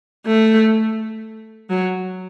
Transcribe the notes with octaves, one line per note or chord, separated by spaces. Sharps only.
A3
F#3